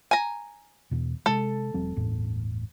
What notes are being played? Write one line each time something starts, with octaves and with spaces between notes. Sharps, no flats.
G#5 A#5
E2 B2
C3 G#3 A4
E1 F#3 C4
G1 E2 A2